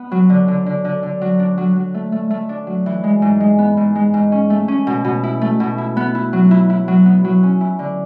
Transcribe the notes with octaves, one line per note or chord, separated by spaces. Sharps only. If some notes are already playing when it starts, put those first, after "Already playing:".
Already playing: B3
F#3
D3
D3
D3
D3
D3
F#3
D4
F#3
F#3
A3
A3
A3
D4
F#3
E3
G#3
G#2
G#3
B3
G#2
G#3
G#2
C#4
A3
C#4
B2
B2
E4
A3
B2
E4
B3
E4
F#3
E4
E4
F#3
B3
F#3
C#4
E4
D3